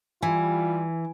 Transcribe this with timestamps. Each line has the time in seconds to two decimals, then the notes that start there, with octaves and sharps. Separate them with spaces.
0.22 E3 G3 F4 G#5